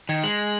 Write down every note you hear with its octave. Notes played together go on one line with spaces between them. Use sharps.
D#3 G#6
G#3 F#7
G#6